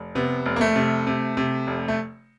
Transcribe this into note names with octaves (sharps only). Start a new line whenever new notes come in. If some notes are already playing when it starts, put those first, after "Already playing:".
Already playing: F1
C3 B3
F1
A#3
A3
C3
C3
C3
F1
A3